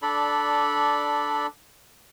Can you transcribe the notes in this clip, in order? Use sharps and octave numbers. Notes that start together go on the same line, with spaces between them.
D4 A4 D5 B5